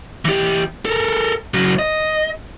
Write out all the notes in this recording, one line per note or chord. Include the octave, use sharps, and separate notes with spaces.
E3 G4
A4 A#4
C#3 F#3
D#5